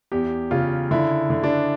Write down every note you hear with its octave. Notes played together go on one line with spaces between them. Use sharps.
E2 G4
C#3 F4
D3 E4
D3
D4